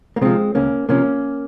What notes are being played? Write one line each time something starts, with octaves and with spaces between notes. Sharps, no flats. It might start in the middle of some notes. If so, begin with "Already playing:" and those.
A#3
C3 F3 G#3 C4
C#2 A#3 C#4
C3 F3 A#3 C#4